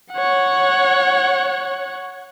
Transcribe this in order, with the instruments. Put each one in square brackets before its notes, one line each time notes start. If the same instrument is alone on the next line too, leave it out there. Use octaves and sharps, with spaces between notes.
[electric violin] C#5 F#5